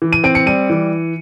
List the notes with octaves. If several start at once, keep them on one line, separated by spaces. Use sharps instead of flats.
E3
D#7
C4 D7
C#7
G3 D#7
E3